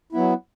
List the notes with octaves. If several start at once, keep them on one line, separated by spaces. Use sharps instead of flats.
F#3 B3 E4